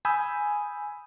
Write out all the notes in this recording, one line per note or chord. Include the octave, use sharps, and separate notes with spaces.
G#5 B5 D#6 E6 G6